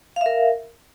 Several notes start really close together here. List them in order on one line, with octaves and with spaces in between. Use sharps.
F5 E5 A#4